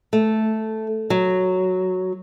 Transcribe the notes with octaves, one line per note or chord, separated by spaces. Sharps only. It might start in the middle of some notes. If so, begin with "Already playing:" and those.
A3
F#3